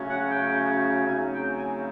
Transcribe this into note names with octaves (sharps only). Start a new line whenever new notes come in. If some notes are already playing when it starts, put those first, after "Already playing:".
Already playing: C#3 F#3 A3 C#4
F#5
G5
C#3 F#3 A3 C4 D#4 G#5
G5
G#5